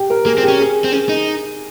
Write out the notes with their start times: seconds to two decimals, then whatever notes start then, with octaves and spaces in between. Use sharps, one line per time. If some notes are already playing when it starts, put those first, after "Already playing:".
Already playing: G4
0.10 A#4
0.26 A#3 G#4
0.38 C4
0.43 G4
0.48 C#4
0.60 G#4
0.84 C4
0.92 C#4 G#4
1.09 D#4